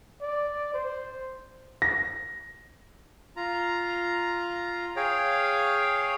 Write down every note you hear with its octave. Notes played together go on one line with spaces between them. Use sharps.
D5
C5
A#6
F4 A#5
G#4 C#5 F5 G5